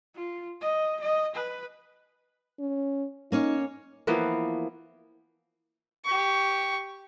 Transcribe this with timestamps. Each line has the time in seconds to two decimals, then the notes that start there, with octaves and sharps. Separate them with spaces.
0.15 F4
0.61 D#5
1.00 D#5
1.35 B4
2.60 C#4
3.32 A#3 C#4 D#4 C#5
4.07 E3 F3 A#3 B3
6.05 G4 C#6